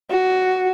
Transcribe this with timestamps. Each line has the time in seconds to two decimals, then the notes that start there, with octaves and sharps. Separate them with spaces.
0.10 F#4